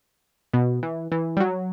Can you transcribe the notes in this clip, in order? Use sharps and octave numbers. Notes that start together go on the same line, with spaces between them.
B2
E3
E3
G3
F#3